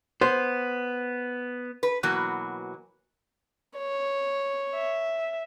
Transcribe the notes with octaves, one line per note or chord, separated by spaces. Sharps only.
B3 C5
B4
B2 E3 F#3 A#3
C#5
E5